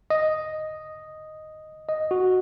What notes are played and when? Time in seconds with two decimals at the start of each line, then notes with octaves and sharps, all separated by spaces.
0.10 D#5
1.89 D#5
2.11 F#4